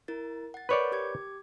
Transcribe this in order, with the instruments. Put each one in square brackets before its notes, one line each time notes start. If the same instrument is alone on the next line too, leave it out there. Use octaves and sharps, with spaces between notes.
[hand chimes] E4 A#4 A6
F#5 A6
[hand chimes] A#4 C#6 G6 [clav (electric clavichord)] B4 C#5 D5
[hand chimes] G4 D6 G#6